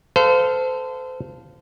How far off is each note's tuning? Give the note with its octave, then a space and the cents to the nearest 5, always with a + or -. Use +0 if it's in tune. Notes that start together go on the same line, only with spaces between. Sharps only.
A4 +0 C5 -35 F5 +0